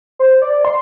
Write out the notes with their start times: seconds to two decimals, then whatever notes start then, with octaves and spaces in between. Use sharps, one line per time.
0.19 C5
0.42 D5
0.65 C6